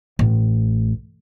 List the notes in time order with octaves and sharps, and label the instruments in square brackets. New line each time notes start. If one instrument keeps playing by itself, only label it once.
[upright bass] A1